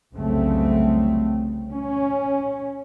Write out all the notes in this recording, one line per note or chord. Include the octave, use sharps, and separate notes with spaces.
F1 C2 C#3 F#3 A3 C4
C#4